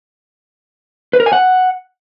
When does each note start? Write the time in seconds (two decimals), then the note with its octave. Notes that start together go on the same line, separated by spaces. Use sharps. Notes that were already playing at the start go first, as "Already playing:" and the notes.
1.13 B4
1.20 A#4
1.26 G#5
1.33 F#5